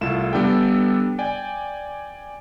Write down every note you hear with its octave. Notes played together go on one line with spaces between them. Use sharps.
C2 A3 E4 F4 E7
G3 B3 D4 A4 G5
D5 G5 G#5